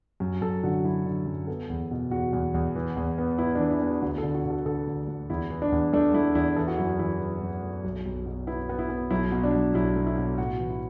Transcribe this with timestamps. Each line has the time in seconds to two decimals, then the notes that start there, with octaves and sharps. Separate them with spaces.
0.20 F#2
0.41 F#2 A4
0.63 D3 F#4
0.84 F#3 E4
1.05 D3
1.26 F#2
1.47 B3 A4
1.70 E2
1.91 B2
2.11 E2 F#4
2.33 E2
2.54 E2
2.76 E3
2.97 E2
3.18 B3
3.38 B3 E4
3.55 D4
3.59 E3
3.71 E4
3.81 B3
3.86 F#4
4.02 D2 F#4
4.18 A4
4.23 D3
4.34 F#4
4.45 D3 A4
4.65 D3 A4
4.87 D2
5.08 D2
5.30 E2 E4
5.50 E3
5.62 D4
5.72 E2
5.93 A3 D4
6.14 A3 E4
6.35 E2 E4
6.56 E3 A4
6.68 F#4
6.77 F#2 E4
6.99 E3 E4
7.20 E3
7.42 F#2
7.62 A3
7.84 B1
8.05 B1
8.26 B2
8.47 B3 E4
8.69 B3
8.79 E4
8.89 B3
9.11 B1 E4
9.32 B2
9.43 D4
9.54 B1
9.74 B1 E4
9.96 A3
10.07 E4
10.18 B2
10.38 A2 F#4
10.60 E3
10.70 E4